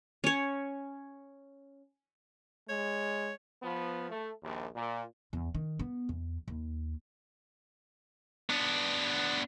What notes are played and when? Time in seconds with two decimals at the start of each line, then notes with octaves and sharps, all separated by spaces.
0.24 C#4 C#5
2.69 G#3 C#5
3.63 F3 B3
4.10 A3
4.44 A#1 D#2
4.76 A#2
5.33 E2
5.55 D#3
5.79 B3
6.09 E2
6.48 D#2
8.50 B3 D4